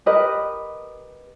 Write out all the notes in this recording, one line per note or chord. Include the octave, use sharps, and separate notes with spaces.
G4 A#4 B4 D#5